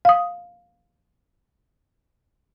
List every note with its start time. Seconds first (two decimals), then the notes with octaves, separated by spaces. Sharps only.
0.05 F5 D#6